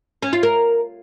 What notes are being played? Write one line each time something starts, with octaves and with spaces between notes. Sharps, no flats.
C#4
F4
A#4